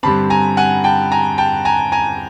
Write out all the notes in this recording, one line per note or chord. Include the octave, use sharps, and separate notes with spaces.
G2 D3 G3 C4 A5 B5
G#5 A#5
F#5 G#5
G5 A5
G#5 A#5
G5 A5
G#5 A#5
G#5 A#5